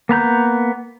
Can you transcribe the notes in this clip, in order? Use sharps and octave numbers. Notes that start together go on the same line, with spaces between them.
A#3 B3 A#5 G6